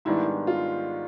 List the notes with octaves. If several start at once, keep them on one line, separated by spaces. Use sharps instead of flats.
G#2 D#3 G3 B3 D4 E4
F4